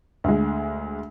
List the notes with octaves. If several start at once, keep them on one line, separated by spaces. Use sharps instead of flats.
D2 G#3